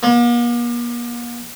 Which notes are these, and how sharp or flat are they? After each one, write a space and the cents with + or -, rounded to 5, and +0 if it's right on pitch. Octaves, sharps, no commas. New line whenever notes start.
A#3 +45